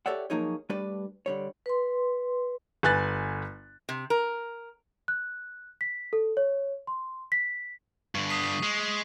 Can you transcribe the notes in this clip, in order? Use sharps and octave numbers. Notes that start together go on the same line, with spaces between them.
G4 A4 C#5 D5 E5 F#5
F3 F#3 A#3 D#4 G#4 C#5
G3 A3 D4 G4 B4 D5
D3 G3 C#5
B4 C6
G1 B4 G#5 F#6 A6
C3
A#4
F#6
B6
A4
C#5
C6
B6
G2 D3 C#6
D#6 B6 C7
G#3